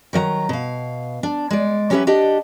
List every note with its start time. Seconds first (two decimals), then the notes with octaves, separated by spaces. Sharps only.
0.13 D#3 F#3 D#5 A#5
0.49 B2 F5
1.23 D4
1.50 G#3 D5
1.90 F#3 C#4 G4 A4 B4 E5
2.07 D4 G4 D#5 F#5